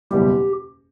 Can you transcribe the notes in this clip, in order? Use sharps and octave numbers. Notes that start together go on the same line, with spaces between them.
F#1 E2 B2 G3 G4